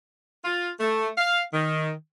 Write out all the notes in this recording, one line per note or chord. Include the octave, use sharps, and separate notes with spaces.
F4
A3
F5
D#3